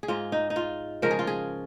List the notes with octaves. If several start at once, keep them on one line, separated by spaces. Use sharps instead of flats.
G#4
G#2 G#3 F4
D#4
D#4
F4
C#3 F3 G#3 A#4
G#4
F4
G#4